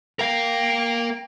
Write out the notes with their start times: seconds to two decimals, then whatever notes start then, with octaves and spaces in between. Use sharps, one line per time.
0.19 A#4 F5 G5